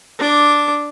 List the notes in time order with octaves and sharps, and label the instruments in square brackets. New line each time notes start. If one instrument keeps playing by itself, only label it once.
[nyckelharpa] D4 D6